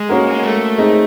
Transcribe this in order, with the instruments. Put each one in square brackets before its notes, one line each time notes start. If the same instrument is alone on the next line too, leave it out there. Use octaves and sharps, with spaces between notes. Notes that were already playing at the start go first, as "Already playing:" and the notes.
Already playing: [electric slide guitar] G#3
[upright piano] A#3 C#4 F#4 A#4
[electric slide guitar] A3
[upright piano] G#3 C4 D#4